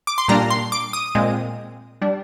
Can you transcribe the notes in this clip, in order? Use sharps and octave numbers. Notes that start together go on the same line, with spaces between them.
D6
C6
A#2 G3 A#3 D4 A#5
C6
D6
D#6
A#2 G#3 C4
G3 D4